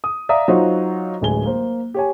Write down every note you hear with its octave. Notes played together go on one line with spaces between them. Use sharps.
D#6
D5 E5 F5 A#5 D#6
F#3 D#4 F4 F#4 C5
D1 A1 G#3 G#5 G7
A#3 C5
G4 C#5 G#5